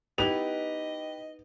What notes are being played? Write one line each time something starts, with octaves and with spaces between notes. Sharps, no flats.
B3 D#4 E4 G4 B4 D#5 F7